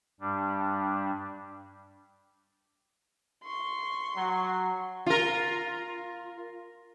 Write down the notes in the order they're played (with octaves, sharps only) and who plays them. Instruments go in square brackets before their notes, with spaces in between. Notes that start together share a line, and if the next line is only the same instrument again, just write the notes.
[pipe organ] G2 G3 D4
[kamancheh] C6 C#6
[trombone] F#3
[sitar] F4 A#4